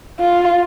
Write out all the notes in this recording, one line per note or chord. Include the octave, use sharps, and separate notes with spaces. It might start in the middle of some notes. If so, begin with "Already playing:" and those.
F4